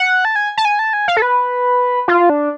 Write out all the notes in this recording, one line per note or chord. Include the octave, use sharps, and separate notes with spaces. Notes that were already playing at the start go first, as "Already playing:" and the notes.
Already playing: F#5
A5
G#5
A5
G#5
A5
G#5
F5
A4
B4
F4
D4